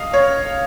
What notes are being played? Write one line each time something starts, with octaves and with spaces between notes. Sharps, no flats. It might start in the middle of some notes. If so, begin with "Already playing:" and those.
Already playing: D#5 F5
C#5